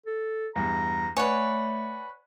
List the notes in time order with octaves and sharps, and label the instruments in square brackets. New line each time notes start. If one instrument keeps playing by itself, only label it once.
[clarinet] A4
[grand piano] E2 G2 [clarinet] A#5
[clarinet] A3 [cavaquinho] B4 C#5 [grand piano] D5 F#5 G#5